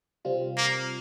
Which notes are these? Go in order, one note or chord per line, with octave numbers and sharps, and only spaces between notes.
C3 G3 C4 F4
A#3